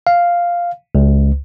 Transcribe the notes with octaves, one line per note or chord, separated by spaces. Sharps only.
F5
C#2